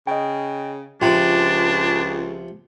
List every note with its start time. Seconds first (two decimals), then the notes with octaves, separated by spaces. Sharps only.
0.07 C#3 D#5 G5
1.02 C#2 C3 F3 D4 F4 G5